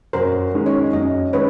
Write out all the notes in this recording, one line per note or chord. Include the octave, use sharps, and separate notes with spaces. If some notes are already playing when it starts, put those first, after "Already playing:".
F#2 A#4 C5
D#3 G#3 C#4
C#5 D#5
F#2 C#5 D#5
D#3 G#3 C#4 B4 C#5